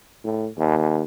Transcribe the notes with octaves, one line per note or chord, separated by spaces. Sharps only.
A2
D#2